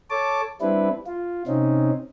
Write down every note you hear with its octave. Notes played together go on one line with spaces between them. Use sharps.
A4 C#5 A5 D6
G3 C4 D4 E4 B4
F4
C3 C4 C#4 D#4